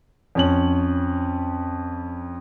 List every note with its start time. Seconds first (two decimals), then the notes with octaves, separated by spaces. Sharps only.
0.35 F2 C#4 F#7